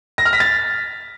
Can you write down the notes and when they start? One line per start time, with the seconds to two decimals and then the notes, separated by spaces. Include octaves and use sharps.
0.18 A#6
0.25 F6
0.33 B6
0.40 A6